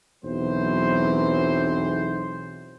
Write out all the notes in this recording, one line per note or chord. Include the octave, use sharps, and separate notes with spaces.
B1 E2 E3 F#3 C4 C5